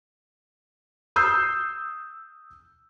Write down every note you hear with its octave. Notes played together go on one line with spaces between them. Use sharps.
D#6 E6 G6 C7